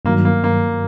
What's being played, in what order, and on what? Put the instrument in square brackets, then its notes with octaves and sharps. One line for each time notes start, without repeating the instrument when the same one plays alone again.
[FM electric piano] G2 D#3 F#3 [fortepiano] A#3
[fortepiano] A#3
A#3